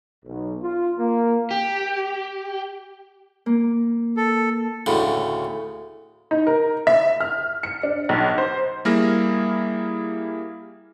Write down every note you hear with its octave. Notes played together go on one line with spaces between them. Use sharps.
B1
F4
A#3
G4
A#3
A4
D2 A2 C#3
D#4
A#4
E5
F6
C#7
D4
B1
C5
G3 A#3 E4 G#4 F6 A#6